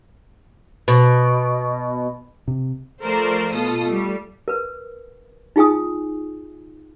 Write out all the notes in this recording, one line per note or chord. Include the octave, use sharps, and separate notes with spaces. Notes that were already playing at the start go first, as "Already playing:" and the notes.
B2
C3
F3 A3 A#4 C5 D5
B2 F4 A4 D#6
G3 A3
A#4 B4
D#4 F4 G#4 G#5 D#6